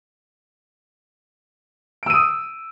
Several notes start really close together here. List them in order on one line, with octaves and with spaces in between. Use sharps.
D7 E6 D#7 D#6